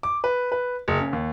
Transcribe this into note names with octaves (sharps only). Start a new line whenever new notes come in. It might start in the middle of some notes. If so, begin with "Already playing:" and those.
D6
B4
B4
F#1
C#3
D#2